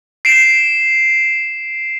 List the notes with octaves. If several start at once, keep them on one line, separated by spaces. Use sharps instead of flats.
C7 D7 E7